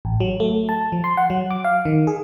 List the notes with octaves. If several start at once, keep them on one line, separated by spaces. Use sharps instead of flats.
A1
F#3
A3
A5
F3
C6
F#5
F#3
D6
F5
D#3
G#4